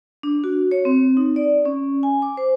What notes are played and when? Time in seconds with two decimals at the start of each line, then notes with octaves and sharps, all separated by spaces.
0.23 D4
0.44 F#4
0.71 C#5
0.85 C4
1.17 D#4
1.36 D5
1.65 C#4
2.03 G#5
2.22 D6
2.37 C5